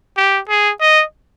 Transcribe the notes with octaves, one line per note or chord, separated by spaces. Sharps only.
G4
G#4
D#5